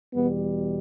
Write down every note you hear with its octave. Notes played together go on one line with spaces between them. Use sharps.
E2 B2 G3 B3